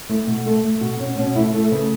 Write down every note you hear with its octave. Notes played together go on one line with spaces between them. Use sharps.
A3 E4
B2
A3 A4
A3
B2 F#4
B2 C#4
B2 C#4
A3 E4
A3 A4
C#3 B4